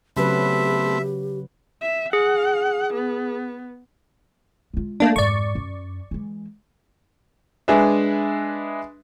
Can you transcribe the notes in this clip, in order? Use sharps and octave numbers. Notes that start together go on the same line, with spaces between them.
C#3 F#3 A3 B3 C4 G4 B4 E5
E5
G#4 F#5
B3
G#3 F4
A3 A#3 D4
F2 G#2 D5 C#6
F#2
E3 G#3
G#3 D4 G#4 B4 E5